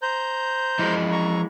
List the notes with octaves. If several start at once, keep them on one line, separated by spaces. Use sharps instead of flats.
C5 A#5 G6
E3 F3 G#3 D#5
A#5 C#6